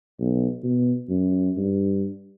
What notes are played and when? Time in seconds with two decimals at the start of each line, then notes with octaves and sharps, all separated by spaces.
0.20 B1
0.63 B2
1.09 F#2
1.57 G2